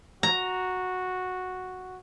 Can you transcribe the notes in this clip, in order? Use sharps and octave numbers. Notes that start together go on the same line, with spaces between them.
F#4 A#5